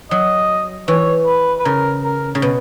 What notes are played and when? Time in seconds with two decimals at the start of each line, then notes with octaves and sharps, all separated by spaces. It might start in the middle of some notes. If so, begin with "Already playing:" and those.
0.11 F#3 D#5
0.88 E3 C#5
1.27 B4
1.60 B4
1.65 C#3 A#4
2.04 A#4
2.35 C#3
2.42 B2